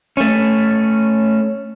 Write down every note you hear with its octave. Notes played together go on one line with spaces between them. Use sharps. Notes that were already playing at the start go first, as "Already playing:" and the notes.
A3 C#4